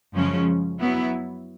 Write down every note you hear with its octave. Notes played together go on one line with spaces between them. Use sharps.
F#2 C#3 F3 G#3 C#4
F#3 B3 E4